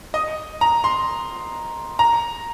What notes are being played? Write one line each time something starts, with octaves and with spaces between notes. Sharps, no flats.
D#5
A#5
C6
A#5